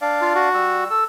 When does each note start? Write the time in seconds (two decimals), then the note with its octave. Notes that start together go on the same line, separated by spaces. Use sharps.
0.01 D4 D5 F5
0.22 F4
0.35 F#4
0.54 G3 E6
0.90 A4 E6